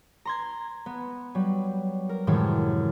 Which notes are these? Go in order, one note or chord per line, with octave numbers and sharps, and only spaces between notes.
A#5 C6 G#6
B3
F#3 G3
A#4
F#2 A2 C3 D#3 E3 G#3